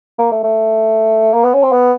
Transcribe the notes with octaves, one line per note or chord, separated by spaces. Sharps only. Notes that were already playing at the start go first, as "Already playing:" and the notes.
A#3
A3
A3
A#3
B3
C#4
C4
B3